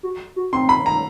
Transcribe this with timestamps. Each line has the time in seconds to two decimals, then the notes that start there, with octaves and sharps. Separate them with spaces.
0.03 F#4
0.36 F#4
0.53 C4 C6
0.69 B5
0.86 A#5